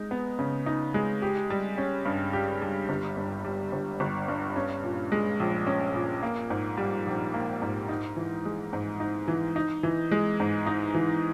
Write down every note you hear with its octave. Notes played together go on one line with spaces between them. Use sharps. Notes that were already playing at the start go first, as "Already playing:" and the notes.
Already playing: G#3 D#4
B3
C#3
D#4
G#3
G4
G3
C#4
G2
G4
G3
G1
G2
G3
G1
G1
G2
C#4
A#2
G#3
A#1
C#4
A#2
A#3
G#2
G3
A#1
A#3
G#2
D#4
E3
G#3
G#2
D#4
E3
D#4
E3
G#3
G#2
D#4
E3